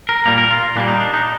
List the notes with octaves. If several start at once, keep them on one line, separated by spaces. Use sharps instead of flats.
A#4
A#2 G3 A#3 A#4
A#4
F4
A#2 G3 A#3 D4
D#4
D4
D#4